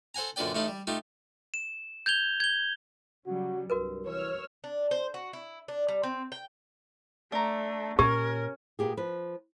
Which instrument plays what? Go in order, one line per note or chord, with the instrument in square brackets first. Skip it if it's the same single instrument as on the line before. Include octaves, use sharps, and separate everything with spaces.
[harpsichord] A4 C5 F#5 G#5 A#5
F#2 A#2 D3 B4 D5 G5
A1 A3 D#4 F5 A5 B5
G3
A3 D#4 F4 G4
[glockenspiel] E7
G6 G#6 F7 G7
G#6 G7
[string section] C#3 F#3 G3 [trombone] F#4
[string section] C2 [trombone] G2 [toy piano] F#4 A#4 B4
[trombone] E3 [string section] C#5 E6 F6
[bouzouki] D4
C5
F#4
E4
D4
G3
C4
G5
[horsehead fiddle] A3 [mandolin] D4 A#5
[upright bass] A#2 [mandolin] C#4 [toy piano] G4 [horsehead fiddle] A#4
[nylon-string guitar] A#2 B3 G4 G#4
F3 B4